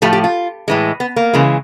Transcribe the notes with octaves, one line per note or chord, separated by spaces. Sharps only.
A2 F3 A3 G4
G4
F4
A2 E3 G#3
B3
A#3
C#3 E3 G#3